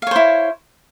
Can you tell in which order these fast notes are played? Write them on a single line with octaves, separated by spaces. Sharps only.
F5 C#5 C5 E4